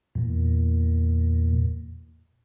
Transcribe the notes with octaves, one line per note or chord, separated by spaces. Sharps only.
E2 A#2